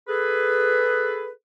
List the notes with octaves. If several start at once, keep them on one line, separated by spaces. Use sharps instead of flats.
G#4 A4 B4